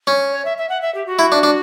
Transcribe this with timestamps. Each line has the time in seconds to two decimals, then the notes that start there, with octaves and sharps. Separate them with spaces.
0.07 C#4
0.33 C#5
0.45 E5
0.58 E5
0.69 F#5
0.82 E5
0.95 G4
1.06 F#4
1.19 E4
1.32 D4
1.43 D4